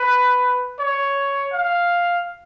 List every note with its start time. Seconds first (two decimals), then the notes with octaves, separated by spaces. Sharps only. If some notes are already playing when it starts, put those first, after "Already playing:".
Already playing: B4
0.79 C#5
1.52 F5